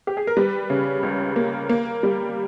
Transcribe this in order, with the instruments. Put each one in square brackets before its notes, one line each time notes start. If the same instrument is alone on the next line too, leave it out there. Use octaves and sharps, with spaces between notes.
[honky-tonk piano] G4
G#4
A#4
G3 B4
C#3
C#2
A#3
A#3
G3